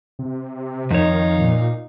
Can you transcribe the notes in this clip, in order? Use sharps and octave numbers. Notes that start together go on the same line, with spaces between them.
C3
F2 D#3 D#4 C#5 F5
A#2